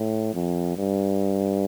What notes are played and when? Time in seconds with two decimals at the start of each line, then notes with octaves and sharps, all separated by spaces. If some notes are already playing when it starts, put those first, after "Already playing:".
Already playing: A2
0.34 F2
0.77 G2